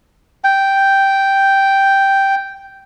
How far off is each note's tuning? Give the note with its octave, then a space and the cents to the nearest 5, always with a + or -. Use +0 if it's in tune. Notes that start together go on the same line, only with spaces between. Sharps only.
G5 -5